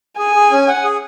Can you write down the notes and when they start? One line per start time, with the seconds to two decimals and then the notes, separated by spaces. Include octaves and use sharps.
0.18 G#4 G#5
0.35 G#4
0.51 C#4
0.68 F#5
0.84 G#4